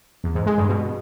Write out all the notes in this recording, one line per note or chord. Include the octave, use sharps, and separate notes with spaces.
E2
G#2
G#3
G2
B2